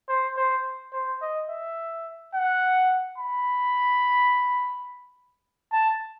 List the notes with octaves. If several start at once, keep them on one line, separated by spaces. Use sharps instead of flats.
C5
C5
C5
D#5
E5
F#5
B5
A5